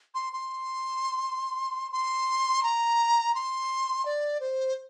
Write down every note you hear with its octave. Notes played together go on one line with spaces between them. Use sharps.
C6
C6
C6
A#5
C6
D5
C5